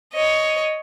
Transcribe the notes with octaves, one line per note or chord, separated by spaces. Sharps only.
C#5 D#5